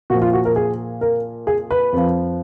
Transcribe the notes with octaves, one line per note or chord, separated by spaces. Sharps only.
A#2 F3 F#4
F4
F#4
A#4
G#4
A#4
G#4
B4
F2 F3